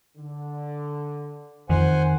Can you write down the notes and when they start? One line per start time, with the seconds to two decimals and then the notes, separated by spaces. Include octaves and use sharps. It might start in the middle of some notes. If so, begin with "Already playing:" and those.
0.18 D3
1.70 F2 D#3 C5 F#5 G#5